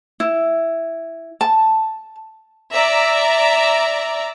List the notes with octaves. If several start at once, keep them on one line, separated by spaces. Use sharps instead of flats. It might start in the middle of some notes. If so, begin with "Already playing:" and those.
E4
A5
D5 E5 A#5